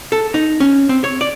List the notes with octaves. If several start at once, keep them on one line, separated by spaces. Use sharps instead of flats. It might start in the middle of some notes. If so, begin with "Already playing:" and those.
A4
D#4
C#4
C4
C#5
D5